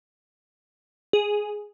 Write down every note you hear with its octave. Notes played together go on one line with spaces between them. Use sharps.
G#4